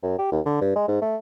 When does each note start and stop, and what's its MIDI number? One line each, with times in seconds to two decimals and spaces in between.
0.03 0.18 42
0.19 0.31 67
0.32 0.40 39
0.46 0.57 50
0.61 0.71 43
0.76 0.84 56
0.88 1.01 44
1.02 1.16 57